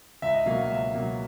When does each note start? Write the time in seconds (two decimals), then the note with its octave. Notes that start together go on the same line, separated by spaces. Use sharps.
0.22 C#2 E5
0.34 D#5
0.46 B2 F#3 A#3 F5
0.58 F5
0.70 C#2 E5
0.94 B2 F#3 A#3